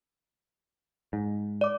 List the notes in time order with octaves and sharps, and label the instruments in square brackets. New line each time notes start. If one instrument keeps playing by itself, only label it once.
[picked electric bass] G#2
[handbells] D5 D6